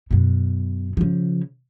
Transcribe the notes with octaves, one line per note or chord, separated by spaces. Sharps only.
F#2 B2
C#3 F3